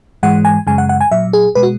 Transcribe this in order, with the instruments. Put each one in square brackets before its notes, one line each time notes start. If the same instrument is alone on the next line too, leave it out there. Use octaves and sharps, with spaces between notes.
[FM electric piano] G#2 E3 G#3 F#5
G#5
F#2 C#3 G#3 G#5
F#5
F#5
G#5
A#2 F#3 E5
G#4
B2 G#3 B4
F#4